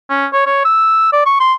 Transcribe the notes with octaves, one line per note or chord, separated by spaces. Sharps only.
C#4
C#5
C#5
E6
D5
C#6
C6